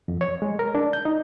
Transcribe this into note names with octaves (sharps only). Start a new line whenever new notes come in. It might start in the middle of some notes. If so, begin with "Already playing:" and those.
F2
C#5
G#3
A#4
D4
G6
D#4